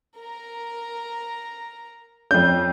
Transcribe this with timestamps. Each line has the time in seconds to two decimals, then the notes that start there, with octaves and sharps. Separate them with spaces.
0.17 A#4 A#5
2.31 F2 C#4 G6